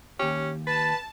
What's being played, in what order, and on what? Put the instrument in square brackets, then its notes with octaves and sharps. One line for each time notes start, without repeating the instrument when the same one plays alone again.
[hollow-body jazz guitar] D#2 G4 [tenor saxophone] C#4
[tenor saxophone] B4 [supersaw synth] A5 [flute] A6